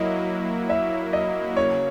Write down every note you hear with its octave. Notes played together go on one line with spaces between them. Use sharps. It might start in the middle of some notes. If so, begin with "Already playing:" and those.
Already playing: F#3 A#3 E4 D#5
E5
D#5
C#3 F#3 A#3 C#5